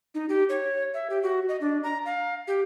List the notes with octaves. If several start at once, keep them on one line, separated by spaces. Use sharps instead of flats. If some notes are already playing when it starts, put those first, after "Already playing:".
D#4
G4
C#5
E5
G4
F#4
D#5
D4
A#5
F5
G4